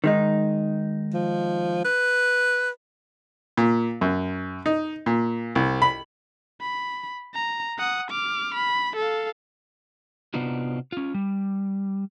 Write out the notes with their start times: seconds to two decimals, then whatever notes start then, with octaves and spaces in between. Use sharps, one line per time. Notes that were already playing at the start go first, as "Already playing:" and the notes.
0.04 D#3 G#3 D#4
1.14 F3
1.85 B4
3.57 A#2
4.01 F#2
4.66 D#4
5.06 A#2
5.55 C2
5.82 B5
6.61 B5
7.35 A#5
7.78 F#5 D#6
8.11 D6 F6
8.55 B5
8.96 A4 F5
10.34 C3 B3 D4 D#4 F4 F#4
10.92 C#4 F4
11.14 G3